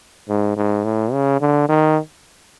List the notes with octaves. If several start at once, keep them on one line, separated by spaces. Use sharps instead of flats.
G#2
G#2
A2
C#3
D3
D#3